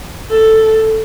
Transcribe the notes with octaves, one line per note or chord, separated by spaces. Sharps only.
A4